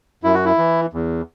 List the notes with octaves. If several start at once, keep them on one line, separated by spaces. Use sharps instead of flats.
F#2 E4
F#4
E4
E3
E2